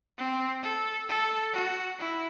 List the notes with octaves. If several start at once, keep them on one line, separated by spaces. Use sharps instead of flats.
C4
A4
A4
F#4
E4